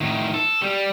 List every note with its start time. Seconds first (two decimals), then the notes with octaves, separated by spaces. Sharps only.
0.01 A2 D#3
0.34 A4
0.62 G3